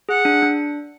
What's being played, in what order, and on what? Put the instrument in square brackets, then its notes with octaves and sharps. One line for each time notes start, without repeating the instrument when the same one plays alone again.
[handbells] G#4 [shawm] F#5
[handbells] D4
D4